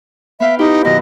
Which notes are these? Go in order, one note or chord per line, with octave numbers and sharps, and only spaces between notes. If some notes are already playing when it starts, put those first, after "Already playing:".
B3 E5 F5 G5
D#4 E4 G4 G5
F#2 B2 D#3 D#5